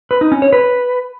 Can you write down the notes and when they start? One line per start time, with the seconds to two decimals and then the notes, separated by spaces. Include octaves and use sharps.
0.11 B4
0.21 D#4
0.32 C#4
0.42 C#5
0.53 B4